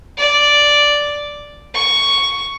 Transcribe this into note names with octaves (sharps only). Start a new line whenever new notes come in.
D5
C#6